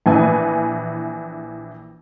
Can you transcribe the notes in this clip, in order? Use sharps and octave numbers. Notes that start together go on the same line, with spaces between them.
A#1 E3 B4 G#5